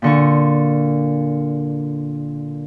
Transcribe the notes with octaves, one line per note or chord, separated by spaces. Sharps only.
A#2 D3 C#6